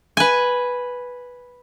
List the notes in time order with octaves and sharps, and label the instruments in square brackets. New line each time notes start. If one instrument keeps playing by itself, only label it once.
[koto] B4 G#5